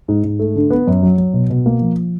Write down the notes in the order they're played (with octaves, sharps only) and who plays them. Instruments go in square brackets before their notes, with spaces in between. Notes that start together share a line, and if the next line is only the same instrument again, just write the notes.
[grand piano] G#2
G#2
A3
D3
B3
F#2
F#3
F#3
B2
B2
A#3
F3